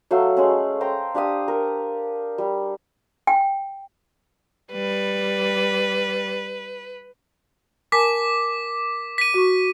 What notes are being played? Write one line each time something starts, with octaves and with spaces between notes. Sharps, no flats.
F#3 A3 F5
G#3 A3 C#4
C5 G5 A#5
D4 G4 F5 D#6
A#4
G3
G5
G3 B4
A#4 G#5 A5 D6 B6
B6 D#7
F#4 C#6